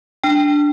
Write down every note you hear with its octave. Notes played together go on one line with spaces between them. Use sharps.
D4 G5